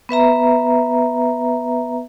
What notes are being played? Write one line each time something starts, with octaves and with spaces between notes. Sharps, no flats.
B3 B4 E5 A#5